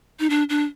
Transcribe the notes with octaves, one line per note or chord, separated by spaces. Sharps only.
D#4
D4
D4